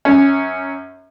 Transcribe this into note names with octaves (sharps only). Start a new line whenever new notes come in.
F#2 C#4